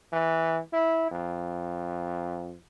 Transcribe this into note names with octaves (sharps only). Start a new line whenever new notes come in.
E3
E4
F2